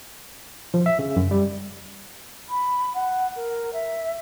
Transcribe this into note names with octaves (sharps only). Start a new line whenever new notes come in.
F3
E5
C#3
F#2
G3
B5
F#5
A#4
E5